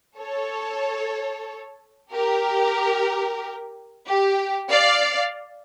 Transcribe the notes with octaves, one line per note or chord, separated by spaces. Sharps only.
A4 C#5
G4 A#4
G4
D5 F5